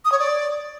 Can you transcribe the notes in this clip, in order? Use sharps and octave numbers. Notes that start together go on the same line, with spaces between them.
D#6
C#5
D5